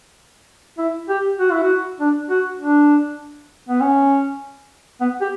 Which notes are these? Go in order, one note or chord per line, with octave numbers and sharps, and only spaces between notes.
E4
G4
F#4
E4
F#4
D4
F#4
D4
B3
C#4
B3
G4